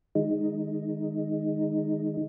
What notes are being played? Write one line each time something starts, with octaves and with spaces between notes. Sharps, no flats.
D#3 G#3 D#4